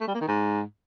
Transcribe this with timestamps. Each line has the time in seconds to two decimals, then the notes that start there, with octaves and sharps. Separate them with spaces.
0.01 A3
0.07 G3
0.14 A#3
0.21 D#3
0.28 G#2